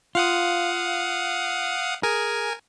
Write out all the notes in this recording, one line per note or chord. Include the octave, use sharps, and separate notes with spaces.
F4 F5 F#5 D#6
G#4 A#4 G#5